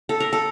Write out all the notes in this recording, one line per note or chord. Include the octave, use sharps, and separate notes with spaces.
A4
A#4
A4